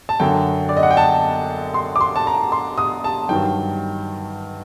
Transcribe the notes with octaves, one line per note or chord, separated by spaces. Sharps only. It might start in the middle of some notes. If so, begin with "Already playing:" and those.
A5
F#2 D3 F#3 G5
D5
D#5
F#5
G5
A5
C6
D6
C6
A5
A#5
C6
D#6
A5
G2 D#3 F#3 G5